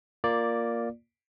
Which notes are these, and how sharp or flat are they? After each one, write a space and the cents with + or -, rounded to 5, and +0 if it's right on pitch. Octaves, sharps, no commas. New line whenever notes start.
A#3 +0 F4 +0 D5 +0